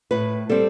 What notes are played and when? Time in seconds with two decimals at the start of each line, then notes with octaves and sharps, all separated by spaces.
0.11 A2 B4
0.49 G3 C4 A4